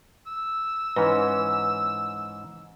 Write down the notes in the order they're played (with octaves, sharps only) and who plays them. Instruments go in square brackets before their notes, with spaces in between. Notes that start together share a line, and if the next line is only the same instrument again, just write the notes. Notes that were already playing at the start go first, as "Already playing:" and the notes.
[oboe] E6
[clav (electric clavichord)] G#2 E3 C#4 [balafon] B4